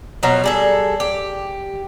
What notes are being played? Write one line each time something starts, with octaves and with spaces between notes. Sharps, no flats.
B2 F3 F#3 A#5
G3 G#4 A4
G4